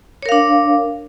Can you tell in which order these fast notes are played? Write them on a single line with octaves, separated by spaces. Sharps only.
C#5 A#4 F5 D4